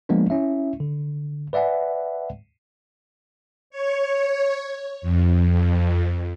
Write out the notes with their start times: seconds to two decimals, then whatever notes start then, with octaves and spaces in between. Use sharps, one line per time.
0.09 F3 G#3 A#3 B3 D4
0.30 C#4 E4 E5
0.80 D3
1.53 B4 D5 E5 F#5 G#5
3.70 C#5
5.02 F2